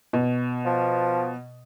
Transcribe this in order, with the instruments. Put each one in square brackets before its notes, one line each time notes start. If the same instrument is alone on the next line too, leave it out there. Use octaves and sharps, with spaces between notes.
[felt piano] B2
[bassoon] F3